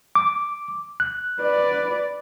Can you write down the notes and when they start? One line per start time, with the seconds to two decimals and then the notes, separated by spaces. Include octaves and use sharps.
0.15 D6
1.00 F#6
1.40 B4 D5